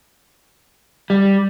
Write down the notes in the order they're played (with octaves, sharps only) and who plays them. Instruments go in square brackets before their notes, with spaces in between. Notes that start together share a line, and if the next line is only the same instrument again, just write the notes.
[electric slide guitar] G3